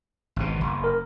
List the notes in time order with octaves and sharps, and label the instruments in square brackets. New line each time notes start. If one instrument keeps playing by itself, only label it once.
[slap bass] G#1 B2
F#1
[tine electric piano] A#4